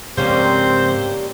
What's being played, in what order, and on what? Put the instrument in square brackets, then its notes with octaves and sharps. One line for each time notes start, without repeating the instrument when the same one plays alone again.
[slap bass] G#2 C#3 F3 [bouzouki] G3 A#3 C#4 [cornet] C4 [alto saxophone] C5